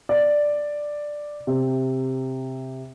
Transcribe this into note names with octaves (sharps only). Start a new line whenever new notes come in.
D5
C3